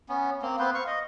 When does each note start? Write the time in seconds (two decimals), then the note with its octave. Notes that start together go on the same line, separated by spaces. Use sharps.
0.09 B3 C#4
0.42 A#3 C4
0.59 B3 C4 B4 C5
0.74 F5 C#6
0.87 D#5